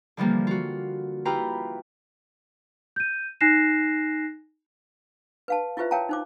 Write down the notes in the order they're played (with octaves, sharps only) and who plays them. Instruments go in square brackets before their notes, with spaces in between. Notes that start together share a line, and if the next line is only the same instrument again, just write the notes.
[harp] D3 E3 F3 G3 A#3
F4 F#4
E4 F4 G4 B4 G5 A#5
[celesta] G6 D#7
D#4 G#5 F#6 A#6 C7 E7
[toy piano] B4 F5 A5
E4 F4 G4 B4 C5 E5
A#4 C#5 F5 G5 A5 A#5
D#4 C5 D6